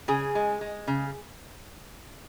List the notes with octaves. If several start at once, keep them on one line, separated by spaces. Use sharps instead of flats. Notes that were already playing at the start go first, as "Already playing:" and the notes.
C#3 G#4
G#3
G#3
C#3